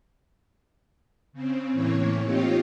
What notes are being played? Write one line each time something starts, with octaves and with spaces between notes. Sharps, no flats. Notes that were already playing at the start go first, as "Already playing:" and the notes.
C#3 C4
A2 E3 A#3 C#5
C4 D#4 F4 G4 C#5